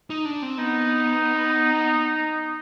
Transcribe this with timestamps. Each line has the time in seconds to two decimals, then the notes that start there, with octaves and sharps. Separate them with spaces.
0.10 D#4
0.25 D4
0.42 C4
0.58 B3 D#4